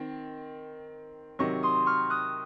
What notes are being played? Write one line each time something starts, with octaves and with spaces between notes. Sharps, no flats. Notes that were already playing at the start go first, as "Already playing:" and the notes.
Already playing: D#3 C4
C3 D#3 F#3 A#5 C#6
C6 D#6
C#6 F6
D#6 F#6